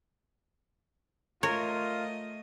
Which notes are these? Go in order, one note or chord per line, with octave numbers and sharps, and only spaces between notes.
A3 F4 A#4 C#5 D#5